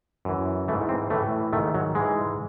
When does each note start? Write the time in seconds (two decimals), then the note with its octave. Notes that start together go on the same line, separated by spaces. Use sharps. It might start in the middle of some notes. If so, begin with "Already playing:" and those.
0.25 F#2 E3
0.68 E3 A3
0.72 G#2
0.89 C4
1.10 A2 E3 A3
1.53 D#3 A3
1.56 G#2
1.75 F#3
1.95 G#2 E3 G#3